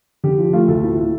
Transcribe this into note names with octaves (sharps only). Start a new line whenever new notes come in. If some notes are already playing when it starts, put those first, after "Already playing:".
D3 G4
F3
A3 F4
D2 A4
A2
A2